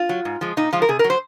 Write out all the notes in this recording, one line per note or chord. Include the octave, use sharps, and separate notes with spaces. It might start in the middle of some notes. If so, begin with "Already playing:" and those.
Already playing: F4
F#3
G#2
F3 G#3
A#2 D#4
F3 G#3 F4
A#4
C3 G#4
A#4
F#3
C5